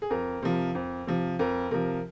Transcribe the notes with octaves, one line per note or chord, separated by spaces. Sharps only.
G#4
F2 A#4
C3 F3
F2
C3 F3
F2 A#4
C3 F3 A#4